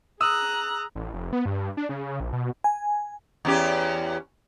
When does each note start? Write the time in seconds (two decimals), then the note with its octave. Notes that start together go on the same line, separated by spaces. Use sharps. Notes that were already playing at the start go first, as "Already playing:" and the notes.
0.21 G#4 A#5 D#6 E6 F#6
0.95 A1
1.14 F1
1.33 B3
1.46 G2
1.77 D4
1.89 C#3
2.20 A#1
2.33 B2
2.64 G#5
3.45 E2 C#4 G4